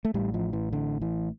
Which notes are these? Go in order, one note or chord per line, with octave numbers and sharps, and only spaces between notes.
A3
A1 A2 G3
F3
E3
D3
E3